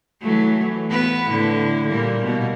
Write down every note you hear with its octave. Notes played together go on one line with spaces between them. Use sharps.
E3 F#3 A3
B3 B4
A2 D3 E4
A#2 G3 A#3
B2 A#3